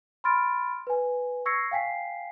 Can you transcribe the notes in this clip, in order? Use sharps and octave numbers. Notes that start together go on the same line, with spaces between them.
B5 C6 F6 A6 D7
B4 G#5
C#6 E6 G#6 A#6 C7 C#7
F5 G5 G#5 B6 C7